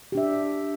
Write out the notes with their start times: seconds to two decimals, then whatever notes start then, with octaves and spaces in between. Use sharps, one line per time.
0.12 G4
0.15 D4
0.17 E5